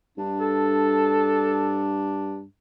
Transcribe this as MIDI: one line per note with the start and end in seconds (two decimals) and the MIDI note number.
0.18 2.43 43
0.18 2.44 62
0.40 1.94 69